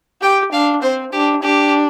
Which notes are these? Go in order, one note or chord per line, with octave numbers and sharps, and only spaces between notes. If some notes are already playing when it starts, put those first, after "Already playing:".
G4 G5
D4 F5
C4 C5
D4 G4
D4 G4